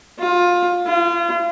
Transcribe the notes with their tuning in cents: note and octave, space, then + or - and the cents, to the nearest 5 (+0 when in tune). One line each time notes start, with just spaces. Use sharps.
F4 +20
F4 -35